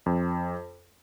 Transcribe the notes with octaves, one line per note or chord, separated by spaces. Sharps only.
F2